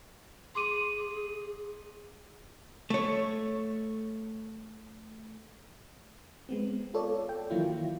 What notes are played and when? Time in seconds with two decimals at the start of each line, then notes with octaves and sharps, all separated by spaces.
0.55 G#4 C6 D6 D#7
2.90 A3 C#5
6.49 G#3 B3 C4
6.94 F4 A4 C#5 D5
7.29 G5
7.50 D#3 E3 F#3 A#3 E4 F4